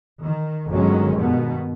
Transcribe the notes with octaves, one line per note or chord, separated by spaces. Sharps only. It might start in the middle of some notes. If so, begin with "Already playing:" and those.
D#3
G1 D#3 F#3 G#3 C#4
G2 B2 D#3 B3